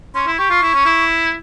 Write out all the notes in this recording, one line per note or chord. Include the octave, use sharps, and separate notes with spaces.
C#4 C6
E4
G4 C#6
F4
E4
C#4
E4